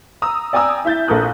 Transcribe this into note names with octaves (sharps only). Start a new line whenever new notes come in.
A#5 D#6 E6
D5 G5 G#5 A#5 D#6 E6
E4 E5 G6 A6
A#1 A4 A#4 D#6 F#6